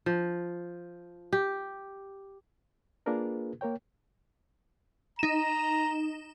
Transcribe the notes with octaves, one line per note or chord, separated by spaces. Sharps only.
F3
G4
A#3 D4 F4 G#4 A#4 B4
A#3 A#4 C#5 G5
D#4 A#5 E7